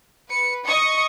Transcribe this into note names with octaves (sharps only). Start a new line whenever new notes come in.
B4 C#7
D#5 C#6 D#6 C#7